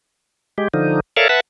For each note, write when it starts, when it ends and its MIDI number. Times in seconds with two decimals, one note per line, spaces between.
0.58 0.68 56
0.58 0.68 67
0.74 1.00 50
0.74 1.00 53
0.74 1.00 63
1.17 1.28 69
1.17 1.28 70
1.17 1.28 73
1.17 1.28 74
1.17 1.28 76
1.17 1.28 77
1.29 1.40 71
1.29 1.40 76
1.29 1.40 78
1.29 1.40 81